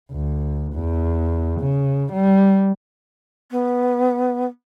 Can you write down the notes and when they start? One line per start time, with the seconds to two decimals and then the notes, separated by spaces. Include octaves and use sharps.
0.12 D2
0.73 E2
1.61 C#3
2.13 G3
3.51 B3